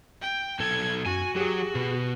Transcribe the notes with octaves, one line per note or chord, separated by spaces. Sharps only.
G5
B1 A4 G#6
F#2 F#4 G#5
F#3 G4 G#4
B2